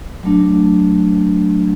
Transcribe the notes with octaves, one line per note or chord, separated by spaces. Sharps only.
F#3 A3 D4